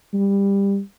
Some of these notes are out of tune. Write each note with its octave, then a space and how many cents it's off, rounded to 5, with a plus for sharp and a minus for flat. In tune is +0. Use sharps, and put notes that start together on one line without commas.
G3 +20